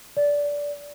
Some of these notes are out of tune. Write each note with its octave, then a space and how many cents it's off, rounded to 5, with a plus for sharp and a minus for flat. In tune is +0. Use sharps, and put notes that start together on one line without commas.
D5 -15